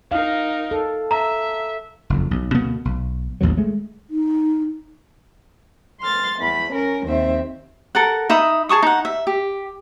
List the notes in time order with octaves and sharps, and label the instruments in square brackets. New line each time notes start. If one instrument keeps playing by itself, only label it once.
[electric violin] D#4 A#4 [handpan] F5
[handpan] A4
[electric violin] E5 [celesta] A#5
[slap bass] F#1 F2
B1
D2 B2 A#3 B3
B1
A1 D#2 B2 F#3
G#3 A3
[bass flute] D#4
[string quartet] C6 F6 A6
E2 B5
C#4 A#4
D#2 C4 E5
[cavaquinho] A4 A#4 F#5
D#4 E5 B5 D#6
G#4 A5 C#6 D#6
D#4 F#5
E5
G4